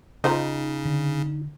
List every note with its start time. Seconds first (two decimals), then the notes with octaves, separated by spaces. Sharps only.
0.24 C#3 D#4 F4 C5 D#5
0.85 D3